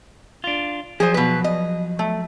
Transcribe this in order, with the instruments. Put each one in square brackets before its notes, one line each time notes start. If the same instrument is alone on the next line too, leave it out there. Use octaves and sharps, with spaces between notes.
[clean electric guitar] D4 F4
[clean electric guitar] F3 F#3 [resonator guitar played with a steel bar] G#4 C5
[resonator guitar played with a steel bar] B2 B4
D#5
A3